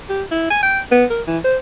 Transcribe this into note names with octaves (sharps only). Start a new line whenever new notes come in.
G4
E4
G#5
G5
B3
A#4
E3
C5